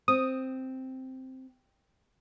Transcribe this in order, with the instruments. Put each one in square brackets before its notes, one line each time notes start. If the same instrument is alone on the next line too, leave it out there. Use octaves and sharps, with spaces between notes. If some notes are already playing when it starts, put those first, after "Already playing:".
[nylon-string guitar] C4 [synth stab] D#6